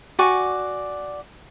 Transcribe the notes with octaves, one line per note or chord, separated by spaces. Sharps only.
F#4 D5 G#5 C#6